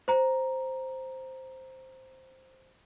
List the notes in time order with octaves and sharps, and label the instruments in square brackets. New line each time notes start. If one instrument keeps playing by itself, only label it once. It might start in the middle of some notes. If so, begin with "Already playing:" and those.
[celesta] C5 A#5